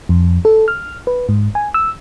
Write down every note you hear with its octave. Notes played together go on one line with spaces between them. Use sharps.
F2
A4
F6
B4
G#2
G#5
E6